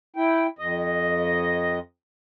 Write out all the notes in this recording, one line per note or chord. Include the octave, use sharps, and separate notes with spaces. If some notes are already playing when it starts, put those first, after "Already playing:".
E4 G5
F2 D#5